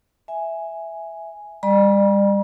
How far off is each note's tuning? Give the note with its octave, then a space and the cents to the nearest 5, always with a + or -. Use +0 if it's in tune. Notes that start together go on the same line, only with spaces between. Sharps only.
E5 +0 G#5 +0
G3 +35 D5 +35 B5 -45